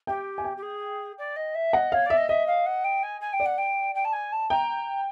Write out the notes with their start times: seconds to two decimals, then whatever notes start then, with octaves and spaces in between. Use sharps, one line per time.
0.07 G4 G5
0.38 G#5
0.45 G5
0.57 G4
0.62 G#4
1.18 D5
1.36 D#5
1.54 E5
1.73 D#5 F#5
1.92 C#5 F5
2.06 D5 E5
2.17 D#5
2.28 D#5 E5
2.47 F5
2.66 F#5
2.84 G5
3.03 G#5
3.20 G#5
3.33 G5
3.40 D5
3.45 F#5
3.57 G5
3.94 G5
4.04 A5
4.12 G#5
4.32 A5
4.50 G5 A#5